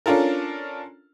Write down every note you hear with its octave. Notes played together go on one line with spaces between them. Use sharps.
C#4 D4 F4 A4 A#4